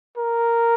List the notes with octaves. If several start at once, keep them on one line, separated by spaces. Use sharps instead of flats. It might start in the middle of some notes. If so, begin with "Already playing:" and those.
A#4